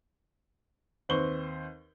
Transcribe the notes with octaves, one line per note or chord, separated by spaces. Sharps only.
D#2 C4 B4 C5 C#6 G7